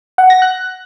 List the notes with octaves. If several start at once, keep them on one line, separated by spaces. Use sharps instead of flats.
F#5
A#6
F#6